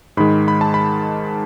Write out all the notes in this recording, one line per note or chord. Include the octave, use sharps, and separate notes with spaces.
G#2 D#3 G#3 B5
B5
A5
B5